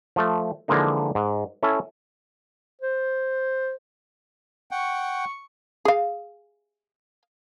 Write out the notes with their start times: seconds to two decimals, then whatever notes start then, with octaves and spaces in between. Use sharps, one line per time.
0.16 F3 A3
0.68 D3 E3 F3 G#3 A#3 D#4
1.15 G#2
1.63 C#4 E4 A4 E5 G#5
2.82 C5
4.71 F#5 G5 C#6
5.85 G#4 F5